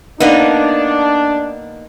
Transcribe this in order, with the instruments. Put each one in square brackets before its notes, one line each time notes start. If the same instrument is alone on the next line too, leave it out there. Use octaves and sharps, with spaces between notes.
[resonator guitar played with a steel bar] A#3 B3 D#4 [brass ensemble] D4